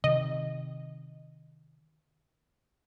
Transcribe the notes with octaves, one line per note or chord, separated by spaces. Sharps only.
C3 D#3 D#5